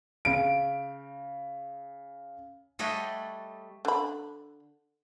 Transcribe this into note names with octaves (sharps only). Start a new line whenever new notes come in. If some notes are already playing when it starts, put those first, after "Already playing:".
C#3 D7
G3 A3 C#5 D#5 F#5 G5
D3 B5